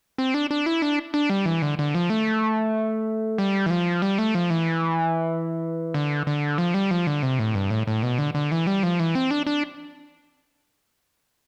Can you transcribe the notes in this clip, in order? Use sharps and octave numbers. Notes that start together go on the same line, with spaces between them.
C4
D4
D4
E4
D4
D4
G3
E3
D3
D3
F3
A3
G3
E3
F3
G3
A3
F3
E3
D3
D3
F3
G3
F3
D3
C3
A2
G2
A2
A2
B2
D3
D3
E3
G3
F3
E3
C4
D4
D4